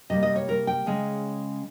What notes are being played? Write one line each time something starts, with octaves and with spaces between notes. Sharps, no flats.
C3 G3 A#3 D#5
D#5
C#5
A#4
G5
C#3 G#3 C#4